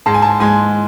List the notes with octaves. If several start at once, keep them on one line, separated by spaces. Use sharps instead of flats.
G#2 G#3 A5
G#5
A5
G#2 G#3 G#5